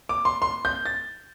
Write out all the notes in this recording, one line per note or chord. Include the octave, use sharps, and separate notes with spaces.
D6
C6
C6
G6
A6